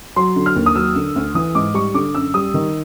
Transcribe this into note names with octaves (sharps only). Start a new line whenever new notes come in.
F#3 C6
D3
F6
D#2
D#6
F#3 E6
D3
D2
E3 D#6
G#2 D6
G3 C#6
D3 D6
F#2 E6
G3 D#6
D#3